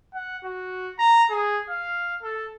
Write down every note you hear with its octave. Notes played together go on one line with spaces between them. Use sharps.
F#5
F#4
A#5
G#4
F5
A4